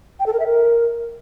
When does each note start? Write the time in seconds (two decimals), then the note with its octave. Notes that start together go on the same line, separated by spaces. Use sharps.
0.20 G5
0.26 A4
0.33 A#4
0.40 E5
0.46 A#4